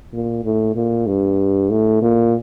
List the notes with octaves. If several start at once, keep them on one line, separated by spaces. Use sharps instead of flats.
A#2
A2
A#2
G2
A2
A#2